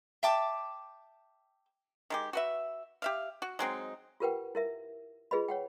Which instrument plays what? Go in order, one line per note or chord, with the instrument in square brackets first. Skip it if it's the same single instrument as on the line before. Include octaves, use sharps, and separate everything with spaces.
[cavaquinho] E5 G5 A5 D6
[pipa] D#3 G#3 G4
F#4 B4 E5
G4 E5 F5
F#4
F#3 G#3 C4 D#4
[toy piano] F4 G4 A#4 B4 F#5 G5
E4 A#4 E5
F4 G#4 B4 D#5 B5
C#5 F#5 G5